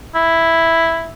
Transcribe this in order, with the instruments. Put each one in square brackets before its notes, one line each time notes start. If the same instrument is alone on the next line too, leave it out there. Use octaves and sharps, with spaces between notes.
[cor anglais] E4